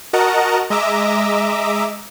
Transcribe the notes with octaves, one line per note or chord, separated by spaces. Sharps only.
F#4 A#4 D#5 F#5 A5 A#5
G#3 D#5 E5 A#5 D6 E6